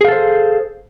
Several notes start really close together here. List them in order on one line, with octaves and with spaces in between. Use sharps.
G#4 F5 A4 C5